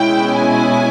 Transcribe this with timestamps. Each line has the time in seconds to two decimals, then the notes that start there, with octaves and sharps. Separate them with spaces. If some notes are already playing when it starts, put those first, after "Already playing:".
Already playing: B2 G#3 C#4 E4 G5
0.32 G#5